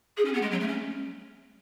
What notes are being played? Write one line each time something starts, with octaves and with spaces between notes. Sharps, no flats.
G#4
C#4
B3
G#3
F#3
A3
C#4